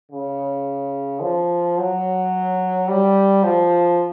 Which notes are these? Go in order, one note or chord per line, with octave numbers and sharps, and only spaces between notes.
C#3
F3
F#3
G3
F3